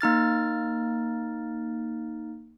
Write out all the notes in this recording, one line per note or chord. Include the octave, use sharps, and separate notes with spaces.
A#3 D#4 F6 A6